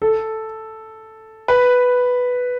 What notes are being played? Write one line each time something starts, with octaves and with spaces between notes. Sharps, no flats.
A4
B4